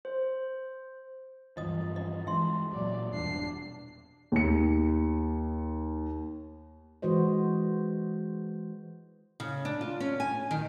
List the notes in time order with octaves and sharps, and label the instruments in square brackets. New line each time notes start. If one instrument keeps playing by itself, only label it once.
[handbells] C5
[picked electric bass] G2 E3 F3 [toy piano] D#5 D#6
[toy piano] D#5
[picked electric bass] E3 G#3 [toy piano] E5 C6
[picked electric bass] A#2 F#3 [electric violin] D5
[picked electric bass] E1 E2 G2 [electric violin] D4 C7
[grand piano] D#2 C#7
[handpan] E3 G#3 F#4 C5 D#5
[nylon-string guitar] C#3
D4
F4
C#4
G#5
D#3